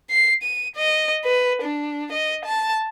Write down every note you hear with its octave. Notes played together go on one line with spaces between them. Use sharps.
C7
D#7
D#5
B4
D4
D#5
A5